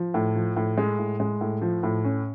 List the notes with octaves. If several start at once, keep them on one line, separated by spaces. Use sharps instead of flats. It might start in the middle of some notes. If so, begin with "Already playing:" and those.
Already playing: F3
A2
F3
A2
G#3
A2
G#3
A2
F3
A2
C#4